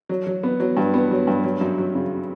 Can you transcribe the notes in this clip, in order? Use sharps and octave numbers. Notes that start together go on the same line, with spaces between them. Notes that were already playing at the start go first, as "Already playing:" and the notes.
F#3
F#3
B3
F#3
G2
B3
F#3
G2
F#3
F#2
F#3
C#3